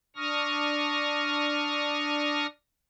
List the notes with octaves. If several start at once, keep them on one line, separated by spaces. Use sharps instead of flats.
D4 C#6 D#6 F6 A#6